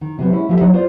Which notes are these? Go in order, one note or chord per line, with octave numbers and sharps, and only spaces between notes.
D#3
C3 F#3 B3
G#3 C#4 E4
F3 E4 G4 A4 E5
F#3 D#4 D5 D#5 F#5
F4 C5 D5